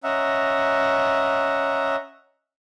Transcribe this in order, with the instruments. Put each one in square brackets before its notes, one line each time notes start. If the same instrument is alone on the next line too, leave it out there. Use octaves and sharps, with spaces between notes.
[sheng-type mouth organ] C#4 D#5 E5 F#5 A#5